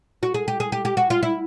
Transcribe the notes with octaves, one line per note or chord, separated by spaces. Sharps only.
F#4
G#4
G4
G#4
G4
G4
F#4
F4
E4